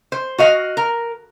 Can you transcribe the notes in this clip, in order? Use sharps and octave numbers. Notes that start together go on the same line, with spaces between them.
C5
F#4 D#5 F5
A#4